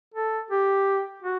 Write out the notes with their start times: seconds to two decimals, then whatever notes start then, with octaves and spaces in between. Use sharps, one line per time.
0.14 A4
0.51 G4
1.23 F#4